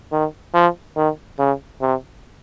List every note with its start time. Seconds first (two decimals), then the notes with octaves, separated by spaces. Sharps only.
0.12 D#3
0.54 F3
0.96 D#3
1.39 C#3
1.81 C3